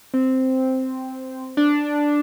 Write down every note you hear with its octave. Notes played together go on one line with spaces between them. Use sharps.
C4
D4